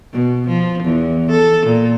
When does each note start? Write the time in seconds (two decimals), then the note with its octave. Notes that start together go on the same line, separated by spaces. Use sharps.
0.13 B2
0.48 F3
0.84 E2
1.31 A4
1.66 A#2